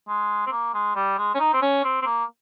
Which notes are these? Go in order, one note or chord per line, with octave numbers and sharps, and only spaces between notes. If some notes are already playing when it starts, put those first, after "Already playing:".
G#3
C4
A#3
G#3
G3
G#3
C#4
D#4
C4
C#4
C4
C4
A#3